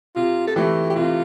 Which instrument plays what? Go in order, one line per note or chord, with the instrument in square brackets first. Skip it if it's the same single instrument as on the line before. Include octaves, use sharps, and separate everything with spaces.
[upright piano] C3 [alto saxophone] F4
[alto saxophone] A4
[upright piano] E3 A3 [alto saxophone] G4
[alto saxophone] G4
[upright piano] C3 [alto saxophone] F4